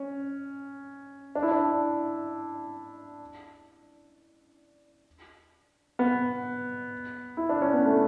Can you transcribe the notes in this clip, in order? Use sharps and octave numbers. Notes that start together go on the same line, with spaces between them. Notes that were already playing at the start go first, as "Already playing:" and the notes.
Already playing: C#4
D4
E4
D4
B3
E4
D4
C#4
B3
A3